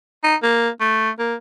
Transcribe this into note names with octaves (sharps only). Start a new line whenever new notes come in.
D#4
A#3
A3
A#3